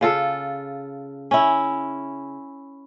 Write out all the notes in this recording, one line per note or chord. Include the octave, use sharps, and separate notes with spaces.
C#3 F4 A4
C#4 E4